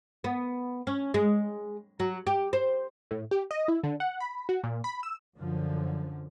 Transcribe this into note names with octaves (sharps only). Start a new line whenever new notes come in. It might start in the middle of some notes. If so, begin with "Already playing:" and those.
B3
C#4
G#3
F#3
G4
C5
A2
G4
D#5
E4
D3
F#5
B5
F#4
A#2
B5
E6
F#2 D3 F3